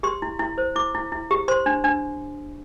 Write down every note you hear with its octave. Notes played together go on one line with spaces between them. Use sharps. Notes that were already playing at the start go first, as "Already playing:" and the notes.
G4 C6
E4
E4
C5
E4 D6
E4
E4
G4
C5 C6
D4
D4